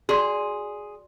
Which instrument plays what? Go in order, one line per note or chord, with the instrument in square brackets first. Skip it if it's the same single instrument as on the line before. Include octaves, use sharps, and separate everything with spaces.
[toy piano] F#4 D5 C6 [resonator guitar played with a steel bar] G#4